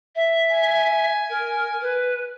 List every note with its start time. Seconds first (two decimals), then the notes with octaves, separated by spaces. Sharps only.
0.15 E5
0.52 G#5
1.29 A#4
1.81 B4